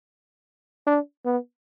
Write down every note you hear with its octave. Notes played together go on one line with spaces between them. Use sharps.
D4
B3